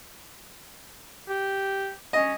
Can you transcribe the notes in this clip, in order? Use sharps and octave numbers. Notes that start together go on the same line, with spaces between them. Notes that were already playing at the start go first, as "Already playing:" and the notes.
G4
C#4 D#5